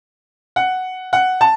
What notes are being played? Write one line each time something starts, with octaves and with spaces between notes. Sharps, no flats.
F#5
F#5
A5